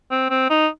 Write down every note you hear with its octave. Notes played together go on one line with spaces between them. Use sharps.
C4
C4
D#4